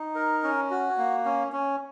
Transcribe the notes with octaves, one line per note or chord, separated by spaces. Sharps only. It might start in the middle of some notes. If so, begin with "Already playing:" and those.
Already playing: D#4
A#4
C#4
F#4
A#3
C#4
C#4